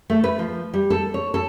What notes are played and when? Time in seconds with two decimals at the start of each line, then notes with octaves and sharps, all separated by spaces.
0.10 A3
0.24 B4
0.39 F3
0.74 G3
0.90 A4
1.14 C#5
1.34 A4